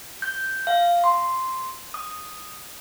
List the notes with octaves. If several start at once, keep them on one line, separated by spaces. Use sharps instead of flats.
G6
F5
C6
D#6